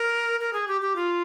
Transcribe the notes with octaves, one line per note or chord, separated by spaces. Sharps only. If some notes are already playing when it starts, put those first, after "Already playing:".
Already playing: A#4
A#4
G#4
G4
G4
F4